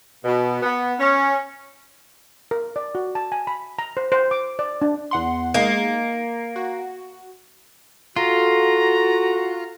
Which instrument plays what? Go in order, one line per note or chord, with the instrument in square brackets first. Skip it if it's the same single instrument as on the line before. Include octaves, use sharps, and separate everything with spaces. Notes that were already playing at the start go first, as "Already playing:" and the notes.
[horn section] B2
B3
C#4
[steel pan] A#4
D5
F#4
A5
G#5
B5
A#5
C5
C5
D6
D5
D4
[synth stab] E2 F#5 C6
[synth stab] G#3 D#4 [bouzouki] A#3
[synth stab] F#4
[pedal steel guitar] F4 [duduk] F#4 [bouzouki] A4 [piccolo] A#5